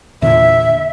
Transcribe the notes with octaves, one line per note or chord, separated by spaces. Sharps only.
E2 A#2 D3 E5